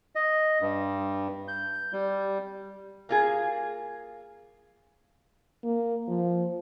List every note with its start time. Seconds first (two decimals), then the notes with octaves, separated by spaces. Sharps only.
0.15 D#5
0.61 G2
1.48 G6
1.93 G3
3.09 A#3 F4 G#4
5.64 A#3
6.08 F3